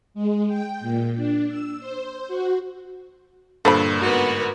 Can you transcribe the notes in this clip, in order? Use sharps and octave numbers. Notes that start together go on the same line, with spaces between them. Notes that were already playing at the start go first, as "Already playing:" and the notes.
G#3
G5
A#2
D4
E6
C5
F#4
G2 A#2 D3 A4 C5 B5
G1 G#2 B3 F#4 A#4